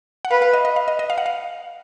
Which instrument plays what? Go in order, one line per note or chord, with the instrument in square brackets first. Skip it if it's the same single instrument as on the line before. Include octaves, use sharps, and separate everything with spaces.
[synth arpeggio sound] F#5
[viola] B4 [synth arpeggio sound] F5
[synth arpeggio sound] F5
D#5
D#5
F5
D#5
D#5
F5
F#5
F5